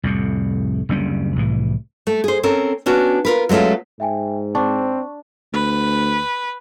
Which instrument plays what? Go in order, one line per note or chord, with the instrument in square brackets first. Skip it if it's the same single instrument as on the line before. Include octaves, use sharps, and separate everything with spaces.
[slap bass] C2 F2 A2
F#1 D2 G3 C#4
C2 A2 E3
[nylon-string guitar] A3
G#4 C5
C4 C#4 A4 A#4
B3 C#4 D4 F#4
F4 A#4 B4
F#3 G#3 A3 C#4 F4
[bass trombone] G#2 [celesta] E5 G5 G#5
[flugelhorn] C4 [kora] D4 [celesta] C#6
[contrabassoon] D2 [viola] B4